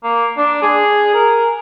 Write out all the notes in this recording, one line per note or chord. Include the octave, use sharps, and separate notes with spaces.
A#3
D4
G#4
A#4